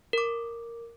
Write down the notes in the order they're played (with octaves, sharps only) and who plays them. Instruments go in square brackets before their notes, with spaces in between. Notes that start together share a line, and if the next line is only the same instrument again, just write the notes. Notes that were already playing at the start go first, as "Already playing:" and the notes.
[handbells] A#4 D6